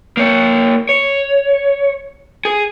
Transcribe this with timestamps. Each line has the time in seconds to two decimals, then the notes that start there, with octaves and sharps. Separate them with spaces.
0.17 A#3 C#5
0.89 C#5
2.45 G#4